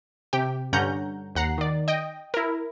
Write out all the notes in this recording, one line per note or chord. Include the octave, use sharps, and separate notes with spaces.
C3 G4 G5
G2 D3 C#4 F#5 A#5 G6
D#2 F#5 A#5 C7
D#3 D5
D#5 G5
E4 A#4